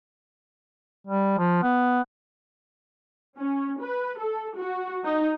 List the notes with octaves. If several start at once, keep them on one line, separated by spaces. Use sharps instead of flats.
G3
F3
B3
C#4
B4
A4
F#4
D#4